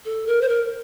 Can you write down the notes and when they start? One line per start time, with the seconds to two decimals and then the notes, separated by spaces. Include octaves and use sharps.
0.05 A4
0.27 A#4
0.42 C5
0.49 A#4